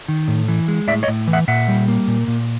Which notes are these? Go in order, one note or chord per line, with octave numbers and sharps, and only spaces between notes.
D#3
A2
E3
G#3
A2 D5 E5
C#5 D#5
A2
E3
E5 F#5
A#2 E5 F#5
G3
A#3
A#2
A#2